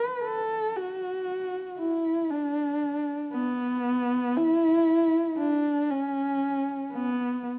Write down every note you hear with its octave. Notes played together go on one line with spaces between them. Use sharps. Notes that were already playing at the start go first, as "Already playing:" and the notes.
Already playing: B4
A4
F#4
E4
D4
B3
E4
D4
C#4
B3